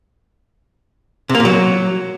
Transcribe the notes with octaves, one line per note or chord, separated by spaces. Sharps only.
C3
A#3
A#2
F#3